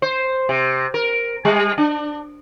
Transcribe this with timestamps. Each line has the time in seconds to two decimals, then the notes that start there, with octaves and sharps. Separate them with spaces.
0.02 C5
0.49 C3
0.94 A#4
1.45 G3
1.78 D4